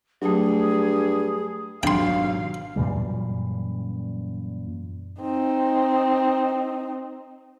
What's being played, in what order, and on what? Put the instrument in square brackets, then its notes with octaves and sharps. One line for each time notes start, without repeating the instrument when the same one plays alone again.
[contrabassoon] G2 [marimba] F#3 A3 [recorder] G#4
[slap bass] G#1 B2 F#3 [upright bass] D4 [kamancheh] F5 [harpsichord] G5 C6
[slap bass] F#2 A#2 E3 G3
[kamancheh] C4 D#4